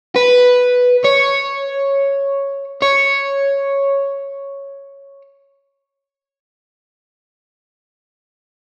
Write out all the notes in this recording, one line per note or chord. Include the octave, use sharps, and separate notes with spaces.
B4
C#5
C#5